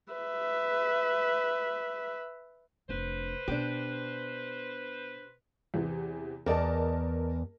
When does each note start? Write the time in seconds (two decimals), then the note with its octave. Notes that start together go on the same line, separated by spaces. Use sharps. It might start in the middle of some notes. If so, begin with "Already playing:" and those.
0.13 B4 E5
2.89 F1 D4 B4 C5
3.48 B2 D4 G4
5.74 E2 C3 E3
6.46 E2 A#4 D5 D#5 A5